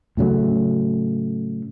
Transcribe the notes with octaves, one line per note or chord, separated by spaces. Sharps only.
A2 C#3 F#3 A3